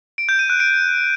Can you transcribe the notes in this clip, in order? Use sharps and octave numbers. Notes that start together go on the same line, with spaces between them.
D7
G6
D#7
F#6
D7